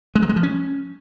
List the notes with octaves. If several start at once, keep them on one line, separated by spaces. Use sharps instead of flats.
G#3
F#3
G#3
F3
C#4